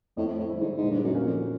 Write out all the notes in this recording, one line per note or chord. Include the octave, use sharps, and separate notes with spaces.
F2 A2
A2
D3 G3 C4 E4
G#2
G#2
A#2
G2
F#2
F3 A#3 C#4 F#4
F2